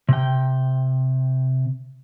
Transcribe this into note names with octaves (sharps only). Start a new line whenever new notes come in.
C3 G5